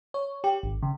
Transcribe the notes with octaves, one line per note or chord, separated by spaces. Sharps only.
C#5
G4
G#1
C#3